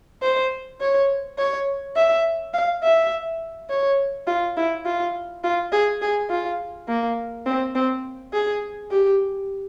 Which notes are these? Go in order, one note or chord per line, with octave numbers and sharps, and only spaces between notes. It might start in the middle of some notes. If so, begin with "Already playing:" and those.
C5
C#5
C#5
E5
F5
E5
C#5
F4
E4
F4
F4
G#4
G#4
F4
A#3
C4
C4
G#4
G4